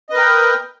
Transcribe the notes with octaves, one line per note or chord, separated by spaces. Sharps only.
A#4 B4 D#5 G5